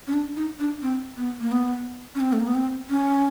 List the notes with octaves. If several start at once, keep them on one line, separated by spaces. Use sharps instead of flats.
C#4
D4
D#4
D4
C4
B3
A#3
B3
C#4
C4
A3
A#3
B3
C4
C#4